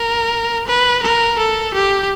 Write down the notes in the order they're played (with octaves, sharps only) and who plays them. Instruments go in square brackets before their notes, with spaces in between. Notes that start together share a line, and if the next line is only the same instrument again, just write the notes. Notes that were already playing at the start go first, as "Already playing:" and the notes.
Already playing: [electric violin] A#4
B4
A#4
A4
G4